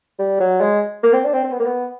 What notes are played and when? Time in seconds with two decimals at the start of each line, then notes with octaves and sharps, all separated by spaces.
0.19 G3
0.40 F#3
0.61 G#3
1.03 A#3
1.13 C4
1.24 D4
1.34 C4
1.44 C4
1.51 B3
1.59 A#3
1.66 B3